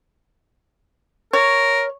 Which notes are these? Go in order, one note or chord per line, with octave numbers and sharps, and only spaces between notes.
A#4 C#5